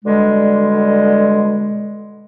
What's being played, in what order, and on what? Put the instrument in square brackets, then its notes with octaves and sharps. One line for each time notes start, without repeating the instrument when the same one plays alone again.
[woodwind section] B2 D3 G3 G#3